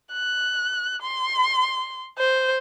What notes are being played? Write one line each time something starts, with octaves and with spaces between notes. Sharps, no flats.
F#6
C6
C5